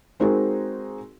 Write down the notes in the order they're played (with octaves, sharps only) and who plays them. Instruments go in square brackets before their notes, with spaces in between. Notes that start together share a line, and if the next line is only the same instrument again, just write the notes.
[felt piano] G#3 C4 D#4 F#4 G#4 A#4